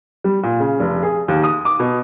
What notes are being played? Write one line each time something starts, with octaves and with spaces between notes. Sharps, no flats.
G3
A#2
C#3
F1
G#4
D#2
D#6
D6
B2